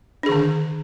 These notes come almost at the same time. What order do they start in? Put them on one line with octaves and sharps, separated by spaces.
D4 G#4 D#3 D3